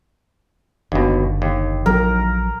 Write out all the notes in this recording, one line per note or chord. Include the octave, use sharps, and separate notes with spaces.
F#1 D#2 B2 D3
D#2
A#1 F#3 A#4